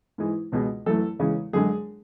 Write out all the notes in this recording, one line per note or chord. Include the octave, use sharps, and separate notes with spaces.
G#2 E3 G#3
C#2 B2 G#3
F#2 E3 A3 A4
E2 C#3 E3 G#3
F#2 D3 G#3 G#4